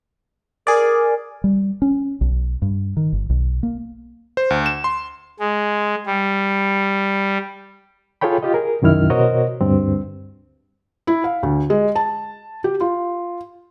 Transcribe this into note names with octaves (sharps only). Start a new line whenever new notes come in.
G#4 A#4 D5
G3
C#4
B1
G2
D#3
G1
B1
A#3
C5
D2
E7
C6
G#3
G3
F4 G#4 A4 C#5 G5 B5
F4 G4 D#5
G#4 A#4
C2 F#2 D#3 E4 F6
B2 F#4 A#4 C5 C#5 D#5
D2 G2 C4
E4
F5
D2
G#3
A5
G4
F4